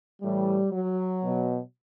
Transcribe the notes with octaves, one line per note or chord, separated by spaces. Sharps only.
A2 E3 G3
F#3
B2